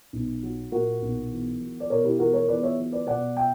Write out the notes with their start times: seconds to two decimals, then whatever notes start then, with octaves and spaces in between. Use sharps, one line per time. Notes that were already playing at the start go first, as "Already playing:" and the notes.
0.13 B1
0.43 F#3
0.72 A#2 F#4 A#4
1.02 B1
1.31 E2
1.60 F#3
1.80 D5
1.90 B2 A#4 C#5
2.04 E4 G4
2.19 E2 F#4 A#4
2.33 A#4 C#5
2.48 E2 B4 D5
2.63 C#5 E5
2.78 F#3
2.92 B4 D5
3.07 B2 D5 F#5
3.37 E5 G5